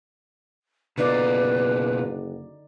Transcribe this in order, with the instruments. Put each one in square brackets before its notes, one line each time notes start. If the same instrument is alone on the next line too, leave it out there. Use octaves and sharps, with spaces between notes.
[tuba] F#1 [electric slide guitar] B2 F4 [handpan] D3 D#4 D5 [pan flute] B4